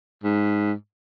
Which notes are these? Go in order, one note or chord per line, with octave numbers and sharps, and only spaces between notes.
G#2